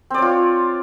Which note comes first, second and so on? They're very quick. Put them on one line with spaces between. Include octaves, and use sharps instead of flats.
C4 D5 C#5 F4